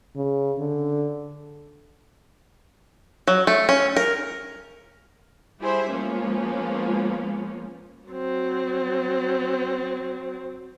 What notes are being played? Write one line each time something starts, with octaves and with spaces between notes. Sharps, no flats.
C#3
D3
F#3
A3
C#4
A#4
G3 E4 G4 G#4 C5 E5
F3 G#3 A#3 B3 C#4
F#3 C4